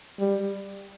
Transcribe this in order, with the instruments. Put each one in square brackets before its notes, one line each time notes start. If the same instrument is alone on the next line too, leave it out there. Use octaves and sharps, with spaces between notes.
[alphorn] G3